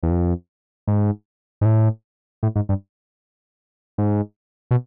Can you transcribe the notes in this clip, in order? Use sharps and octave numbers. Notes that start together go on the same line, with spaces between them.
E2
F2
G#2
G#2
A2
A2
G#2
G2
G#2
B2